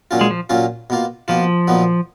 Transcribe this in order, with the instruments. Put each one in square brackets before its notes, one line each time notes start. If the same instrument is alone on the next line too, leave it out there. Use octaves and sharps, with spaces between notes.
[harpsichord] A#2 F#3 C#4 F4
[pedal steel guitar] G#3
F3
[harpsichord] A#2 F#3 C#4 F4
B2 A#3 F4
[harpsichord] B2 A#3 F4 [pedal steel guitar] F3
[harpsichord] A#2 F#3 B3 D#4